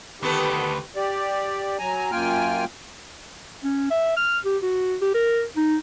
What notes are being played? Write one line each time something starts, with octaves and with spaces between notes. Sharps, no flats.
D2 D#3 B3 G4 A4 B4
G4 D5
F#3 G#5 A#5
F#2 A#3 F4 G5 G#5 F6
C#4
E5
F6
G4
F#4
G4
A#4
D#4